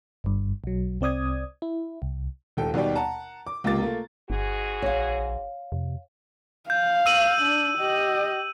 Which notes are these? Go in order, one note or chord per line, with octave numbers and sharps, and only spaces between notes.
G1 G2
B1 F#3
C2 C4 D5 D#6 G#6
E4
C2
D#1 G#1 A4 G5
D#2 B2 G3 B3 D5 G5
F#5 A5 A#5
D6
C#2 C3 A#3 F4 D6 A6
A3 A#3 F4
G1 G#2 F#4 G#4
A#1 C#5 F5
F2 C3
F5 G6
E6 D#7 F#7
D4
G4 D#5